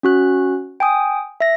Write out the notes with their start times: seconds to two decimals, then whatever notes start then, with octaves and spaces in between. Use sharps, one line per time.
0.03 C#4 F#4 F#6
0.80 G5 G#5 D#6
1.41 E5 A#6